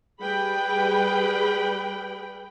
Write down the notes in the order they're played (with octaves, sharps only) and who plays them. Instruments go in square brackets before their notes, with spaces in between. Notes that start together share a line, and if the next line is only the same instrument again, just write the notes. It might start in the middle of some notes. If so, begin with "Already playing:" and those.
[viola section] G3 G#4 B4 G5 B5